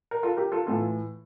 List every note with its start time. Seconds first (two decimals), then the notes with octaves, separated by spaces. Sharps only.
0.11 A#4
0.23 F4 A4
0.37 G4 A#4
0.52 F4 A4
0.66 A2 E3 F4 A4